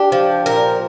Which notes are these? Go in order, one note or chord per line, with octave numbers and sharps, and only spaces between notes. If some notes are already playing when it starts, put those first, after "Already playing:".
Already playing: D4 G4
F3
A#2 A#4